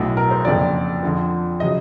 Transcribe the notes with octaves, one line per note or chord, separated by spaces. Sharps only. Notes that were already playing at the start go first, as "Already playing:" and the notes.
Already playing: B1 A2 F#3
A#4
C5
F#1 F2 D3 F3 D5
F2 D3 F3
C#3 F#3 D#5